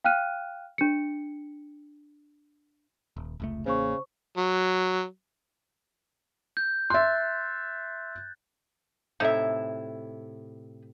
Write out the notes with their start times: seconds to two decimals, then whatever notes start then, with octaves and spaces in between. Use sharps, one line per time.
0.04 F5 G5 F6 F#6 D#7
0.78 D4 C#7
3.16 D#1
3.40 F1 C#2 A3
3.66 A1 C#3 A#3 C5 C#6
4.37 F#3
6.57 G6
6.90 E5 C6 F#6 A6
9.20 A2 C3 D#4 E4 E5